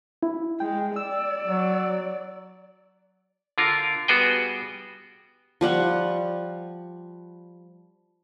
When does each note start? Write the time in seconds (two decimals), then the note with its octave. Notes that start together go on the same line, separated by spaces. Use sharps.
0.23 E4
0.60 G#3 G5
0.96 D5 E6
1.46 F#3
3.58 D3 F4 A#4
4.08 G3 B3 F#4 G#4 B4 G5
5.61 F3 G3 F#5 C#6